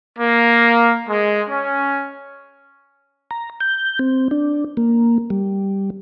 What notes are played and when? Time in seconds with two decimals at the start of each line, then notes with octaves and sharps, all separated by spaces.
0.19 A#3
1.09 G#3
1.50 C#4
3.31 A#5
3.60 G6
3.99 C4
4.31 D4
4.77 A#3
5.30 G3